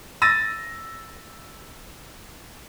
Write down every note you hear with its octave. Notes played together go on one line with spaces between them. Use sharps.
E6 A6 A#6 D#7